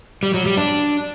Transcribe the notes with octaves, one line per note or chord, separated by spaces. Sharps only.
G3
F#3
G3
D4